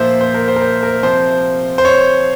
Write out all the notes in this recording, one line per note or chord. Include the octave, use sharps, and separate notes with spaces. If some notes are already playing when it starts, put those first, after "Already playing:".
Already playing: A#2 F3 C5 E5
C5
A#4
C5
A#4
C5
A#4
C3 F3 C5
C5
C#5